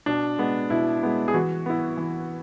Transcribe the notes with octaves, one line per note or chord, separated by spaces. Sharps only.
B2 D4
G#3 B3
B2 E4
G#3 B3
G#4
E3 F#4
B3 E4
E3